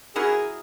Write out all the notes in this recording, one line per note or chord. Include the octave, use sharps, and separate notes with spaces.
F#3 C#4 E4 G#4 A#4